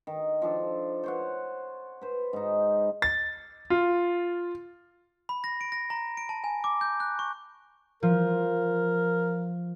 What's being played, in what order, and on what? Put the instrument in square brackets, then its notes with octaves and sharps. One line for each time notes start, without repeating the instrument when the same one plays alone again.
[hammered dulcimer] D#3
F3 D4 A4
C5 C#5 F#5
B4 C5
G#2 D#4
[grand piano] A6
F4
[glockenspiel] B5
A#6
D7
A#6
A#5
D7
A5
G#5
D6
G6
F#6
C#6
[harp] F3 [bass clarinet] A#4